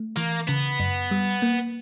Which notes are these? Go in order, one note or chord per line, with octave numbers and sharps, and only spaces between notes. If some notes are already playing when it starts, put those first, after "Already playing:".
Already playing: A3
E3 A#3
C#3 B3
F#2
G3
A#3